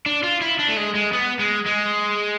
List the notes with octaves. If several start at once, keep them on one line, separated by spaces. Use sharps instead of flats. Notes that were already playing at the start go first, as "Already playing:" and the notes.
D4
F4
E4
D4
A3
G#3
G#3
B3
G#3
G#3